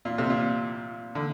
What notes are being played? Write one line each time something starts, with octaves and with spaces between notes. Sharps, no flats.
A#2
C3
A#2
D3